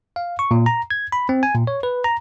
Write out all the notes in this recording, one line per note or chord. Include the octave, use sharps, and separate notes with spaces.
F5
C#6
A#2
A#5
G#6
B5
C4
G#5
A#2
C#5
B4
A#5